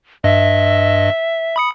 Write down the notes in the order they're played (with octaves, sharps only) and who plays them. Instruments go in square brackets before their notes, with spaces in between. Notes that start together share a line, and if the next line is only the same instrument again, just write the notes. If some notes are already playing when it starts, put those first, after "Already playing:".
[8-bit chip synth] G2 D#5 [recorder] E5
[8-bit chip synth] B5 D#6 C#7